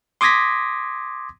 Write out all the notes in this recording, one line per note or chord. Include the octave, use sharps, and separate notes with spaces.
C6 D6 D#6 G#6 A#6 B6